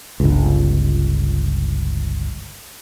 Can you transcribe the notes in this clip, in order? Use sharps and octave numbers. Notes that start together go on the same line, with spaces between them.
G1 C#2